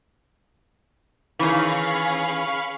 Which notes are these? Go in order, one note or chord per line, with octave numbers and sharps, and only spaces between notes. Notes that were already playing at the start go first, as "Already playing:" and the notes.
D#3 E3 C#4 G#4 F5 B5 C#6